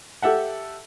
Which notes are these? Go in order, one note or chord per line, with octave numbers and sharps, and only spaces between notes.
G4 A4 E5 F#5